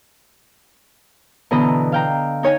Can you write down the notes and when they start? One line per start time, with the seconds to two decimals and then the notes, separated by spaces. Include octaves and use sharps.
1.51 B2 D3 E3 D#5 A#5 B5
1.92 F5 G5 A#5
2.43 D#4 C#5 G#5